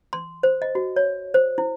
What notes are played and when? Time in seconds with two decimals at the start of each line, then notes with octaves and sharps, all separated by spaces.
0.13 C6
0.43 C5
0.62 D#5
0.75 F#4
0.96 C#5
1.34 C5
1.58 E4